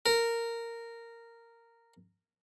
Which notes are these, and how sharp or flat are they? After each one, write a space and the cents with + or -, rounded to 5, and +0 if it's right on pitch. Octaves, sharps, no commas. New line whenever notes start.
A#4 -10